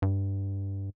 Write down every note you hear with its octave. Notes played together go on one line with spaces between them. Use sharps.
G2